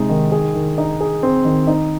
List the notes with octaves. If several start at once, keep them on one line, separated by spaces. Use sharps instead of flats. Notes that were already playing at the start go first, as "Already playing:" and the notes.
Already playing: C3 G#3 D#4
D#3
G#4
D#3
D#4
G#4
C4
D#3
D#4